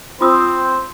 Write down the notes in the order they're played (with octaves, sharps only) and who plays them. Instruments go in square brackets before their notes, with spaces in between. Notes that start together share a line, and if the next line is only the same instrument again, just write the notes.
[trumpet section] C4 [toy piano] F4 D#6 E6 [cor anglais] C5